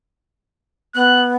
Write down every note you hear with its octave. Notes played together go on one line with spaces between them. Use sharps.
B3 F#6